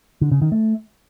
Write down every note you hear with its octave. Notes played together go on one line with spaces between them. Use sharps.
D3
C#3
D#3
A3